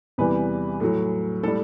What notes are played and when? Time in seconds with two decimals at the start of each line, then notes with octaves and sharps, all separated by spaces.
0.18 E2 C3 E3 G3 B4
0.80 A2 F#3
1.43 A2 G3 A4